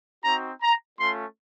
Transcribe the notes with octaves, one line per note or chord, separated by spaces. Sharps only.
C4 D#4 F#4 A#5
A#5
A3 C#4 F4 C6